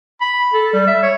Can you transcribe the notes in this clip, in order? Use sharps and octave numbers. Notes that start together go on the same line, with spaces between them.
B5
A4
G3
E5
C#5